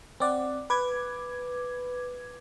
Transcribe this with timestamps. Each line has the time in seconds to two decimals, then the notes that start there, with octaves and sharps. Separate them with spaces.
0.20 C4 D5 F#5
0.70 B4 D6 G#6